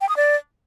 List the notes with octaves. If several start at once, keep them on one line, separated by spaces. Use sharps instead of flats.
G5
D#6
D5